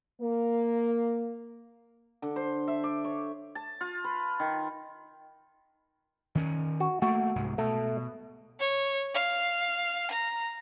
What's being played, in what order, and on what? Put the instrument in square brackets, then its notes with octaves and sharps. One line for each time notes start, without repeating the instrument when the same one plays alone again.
[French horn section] A#3
[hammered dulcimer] D3
C5
E5
D5
C#5
A5
F4
B4
D#3
[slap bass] D#3 C#4
[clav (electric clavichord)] F#4
[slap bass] A3 A#3 [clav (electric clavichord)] F#4
[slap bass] C2 G#2
[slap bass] B2 [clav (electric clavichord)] A3
[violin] C#5
F5
A#5